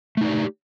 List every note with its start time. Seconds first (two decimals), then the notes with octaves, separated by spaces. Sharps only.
0.17 A3
0.21 D#4
0.25 D5
0.29 G4